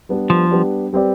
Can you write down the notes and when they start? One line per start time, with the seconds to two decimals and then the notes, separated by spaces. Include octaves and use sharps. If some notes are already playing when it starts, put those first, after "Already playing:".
0.09 G3 B3 D4 G4
0.30 F3
0.51 G3 B3 D4 G4
0.93 G3 C4 G4 B4 D5